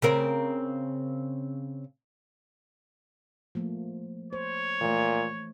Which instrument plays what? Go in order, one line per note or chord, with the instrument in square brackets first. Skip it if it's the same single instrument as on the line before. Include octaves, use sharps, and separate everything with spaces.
[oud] C#3 C4 A#4
[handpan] F3 A3 A#3
[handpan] C5 [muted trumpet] C#5
[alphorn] A#2 [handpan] E3 A3